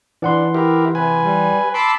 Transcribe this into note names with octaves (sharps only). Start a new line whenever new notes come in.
E3 D4 F#5 C6
E4 G4 A#4
C3 B4 G#5
G3
A5 B5 C6 D6 E6